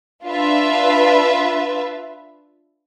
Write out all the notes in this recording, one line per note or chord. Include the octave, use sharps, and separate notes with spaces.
D4 F4 B4 E5